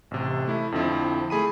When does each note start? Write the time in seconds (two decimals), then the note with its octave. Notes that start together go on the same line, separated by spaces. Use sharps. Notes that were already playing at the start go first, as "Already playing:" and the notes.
0.11 A1 C3
0.47 A3 E4
0.72 F2 D3 F3 C4 E4
1.30 A3 G#4 B5 D#7